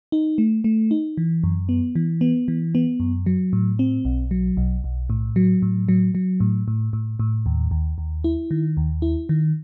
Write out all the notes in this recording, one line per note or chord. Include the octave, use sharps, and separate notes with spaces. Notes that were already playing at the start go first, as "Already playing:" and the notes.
D#4
A3
A3
D#4
E3
F#2
B3
E3
B3
E3
B3
F#2
F#3
A2
C4
B1
F#3
B1
B1
A2
F#3
A2
F#3
F#3
A2
A2
A2
A2
D#2
D#2
D#2
E4
D#3
D#2
E4
D#3